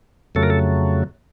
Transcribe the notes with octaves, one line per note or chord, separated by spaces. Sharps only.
F2 C#3 F#3 A3 A4
A#4
A4